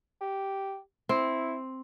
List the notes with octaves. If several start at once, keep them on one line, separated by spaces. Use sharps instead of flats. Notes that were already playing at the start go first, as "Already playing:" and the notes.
G4
C4 E4